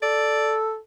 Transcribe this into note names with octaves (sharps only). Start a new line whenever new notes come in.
A4 D5